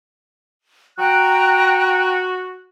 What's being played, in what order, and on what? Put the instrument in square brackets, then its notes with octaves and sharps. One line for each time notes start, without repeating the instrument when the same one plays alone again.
[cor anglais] F#4 [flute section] G5 A#5 F#6